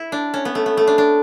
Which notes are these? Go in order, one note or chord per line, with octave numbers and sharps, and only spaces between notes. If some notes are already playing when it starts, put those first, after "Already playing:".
Already playing: E4
D4
C#4
B3
A3
B3
A3
D4
D4